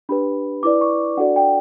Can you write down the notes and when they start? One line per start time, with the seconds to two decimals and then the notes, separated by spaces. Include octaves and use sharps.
0.09 D4 G4 B4 B5
0.63 E4 B4 D5 D6
0.81 C#6
1.17 D4 F#4 A4 D5 F#5
1.36 G5